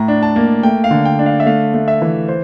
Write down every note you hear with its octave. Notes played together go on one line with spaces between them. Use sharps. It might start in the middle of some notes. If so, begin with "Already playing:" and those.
Already playing: A2 A#5
D4
A5
A#3
A3 G5
F5
D3
G5
D4
F5
E5
A3 F5
A3
E5
E3
C5